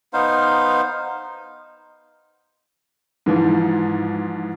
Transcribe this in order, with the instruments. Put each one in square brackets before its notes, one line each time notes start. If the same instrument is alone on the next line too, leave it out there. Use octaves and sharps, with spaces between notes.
[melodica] B3 D#4 C5 F5
[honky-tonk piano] G#2 E3 F3